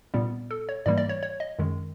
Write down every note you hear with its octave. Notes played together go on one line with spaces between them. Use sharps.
A#2 G3 B3
A4
C#5
G#2 E3 G3 A#3 D5
D5
C#5
C#5
D#5
F#2 D#3 G#3